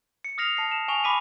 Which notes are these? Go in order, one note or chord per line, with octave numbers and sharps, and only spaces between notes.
C#7
D#6 F6 A#6 C7 F7
A5 C7
E7
G#5 C#6 F7
B5 D6 B6 D#7